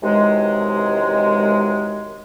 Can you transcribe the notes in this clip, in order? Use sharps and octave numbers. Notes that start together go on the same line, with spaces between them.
F#2 C3 D#3 E3 G#3